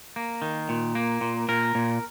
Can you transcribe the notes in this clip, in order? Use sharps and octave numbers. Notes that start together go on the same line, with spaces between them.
A#3
D#3
A#2
A#3
A#2
A#2 A#4
A#2